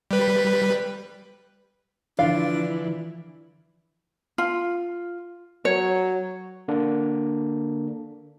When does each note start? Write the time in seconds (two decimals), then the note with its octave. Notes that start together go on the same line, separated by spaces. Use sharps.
0.11 G3 B4
2.19 D3 E3 F3 D4 F4 D5 F5
4.38 F4
5.65 F#3 C#5
6.68 D3 A#3 D4